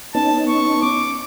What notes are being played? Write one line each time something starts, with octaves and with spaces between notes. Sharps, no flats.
B3 C#4 D#4 A5
C#6
D6